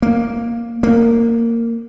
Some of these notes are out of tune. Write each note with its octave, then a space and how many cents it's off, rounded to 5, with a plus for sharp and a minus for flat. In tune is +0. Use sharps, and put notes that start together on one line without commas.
A#3 +0
A#3 -15